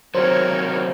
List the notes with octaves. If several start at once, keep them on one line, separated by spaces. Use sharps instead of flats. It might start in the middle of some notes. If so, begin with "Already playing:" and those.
C3 D#3 F#3 A#4 C5 C#5